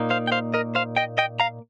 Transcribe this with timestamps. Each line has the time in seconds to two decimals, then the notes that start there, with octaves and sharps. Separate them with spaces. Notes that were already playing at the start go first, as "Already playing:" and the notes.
Already playing: A#2 A#3 D#4
0.10 C5 F5
0.27 G5
0.32 C5 F5
0.54 A#4 D#5
0.75 C5 F5
0.97 D#5 G5
1.18 D#5 G5
1.40 F5 A#5